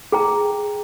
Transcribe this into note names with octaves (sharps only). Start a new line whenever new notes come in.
G#4 G5 A#5